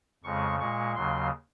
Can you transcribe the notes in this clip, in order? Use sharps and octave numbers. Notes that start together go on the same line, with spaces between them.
F2 C#3 G#3 C#6
A#2 G#3 C#6
D#2 C#3 F#3 C6